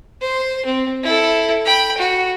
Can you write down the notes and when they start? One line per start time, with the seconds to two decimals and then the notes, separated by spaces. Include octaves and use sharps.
0.21 C5
0.65 C4
1.03 E4 A4
1.65 G5 B5
1.97 F#4